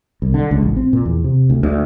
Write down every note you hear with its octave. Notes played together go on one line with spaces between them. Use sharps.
C2
D3
C#2
A1
C4
A#2
E2
C3
D2
D2